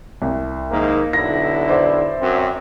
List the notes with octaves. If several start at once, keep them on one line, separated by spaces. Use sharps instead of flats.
C2
G#2 D#3 A#3
B1 D3 E4 A#6
C5 D5 E5
F#2 C4